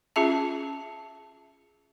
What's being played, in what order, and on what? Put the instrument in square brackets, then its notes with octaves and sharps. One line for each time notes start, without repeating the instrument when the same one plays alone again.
[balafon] C#4 F4 G#4 E5 A5